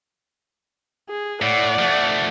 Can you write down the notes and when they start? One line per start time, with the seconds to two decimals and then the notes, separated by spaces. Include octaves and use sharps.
1.09 G#4
1.42 A2 D5 F#5
1.79 F3 A3